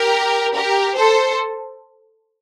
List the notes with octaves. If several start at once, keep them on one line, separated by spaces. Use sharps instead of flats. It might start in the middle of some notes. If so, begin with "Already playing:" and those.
Already playing: G4 A#4
G4 A#4
A4 C5